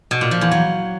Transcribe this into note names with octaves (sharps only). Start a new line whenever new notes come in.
B2
A#2
F3
E2
F#3